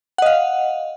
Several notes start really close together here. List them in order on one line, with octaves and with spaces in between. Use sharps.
F#5 D#5 F5